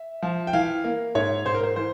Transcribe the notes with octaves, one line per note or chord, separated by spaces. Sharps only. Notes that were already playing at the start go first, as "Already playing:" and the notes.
Already playing: E5
F3
G5
E3 F5
A#3
G#2 C#5
G#2 C5
A#4
C5
E3 C5